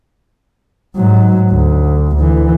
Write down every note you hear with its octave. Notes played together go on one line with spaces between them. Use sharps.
G#2 F#3
D2
D2 E3